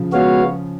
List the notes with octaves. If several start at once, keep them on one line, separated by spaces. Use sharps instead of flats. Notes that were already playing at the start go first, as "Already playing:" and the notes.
Already playing: C#3 F3
G#3 B3 F#4 C#5 F5